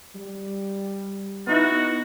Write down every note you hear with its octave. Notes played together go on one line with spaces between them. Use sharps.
G3
B3 D#4 E4 F#4